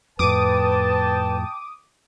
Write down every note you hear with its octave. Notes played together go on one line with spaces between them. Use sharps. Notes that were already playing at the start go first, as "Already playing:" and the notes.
F2 A2 B4 G5 A5 D6 D#6